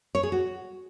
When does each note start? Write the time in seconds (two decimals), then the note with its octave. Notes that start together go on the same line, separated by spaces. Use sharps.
0.15 C#5
0.23 G#4
0.32 F#4